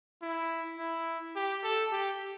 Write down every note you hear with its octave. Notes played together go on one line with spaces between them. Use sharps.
E4
E4
G4
A4
G4